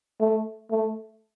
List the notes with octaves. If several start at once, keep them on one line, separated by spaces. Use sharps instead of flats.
A3
A3